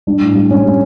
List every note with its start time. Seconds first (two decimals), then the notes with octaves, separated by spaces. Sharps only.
0.07 G3 D4
0.21 A2
0.35 G3
0.51 G3 C#4
0.65 G3